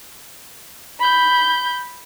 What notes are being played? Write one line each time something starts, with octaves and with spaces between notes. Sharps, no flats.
B5 G6